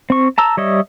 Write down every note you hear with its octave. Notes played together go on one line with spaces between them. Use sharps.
C4 C#6
A5 A#5 E6
G3 C#5 D#5 E5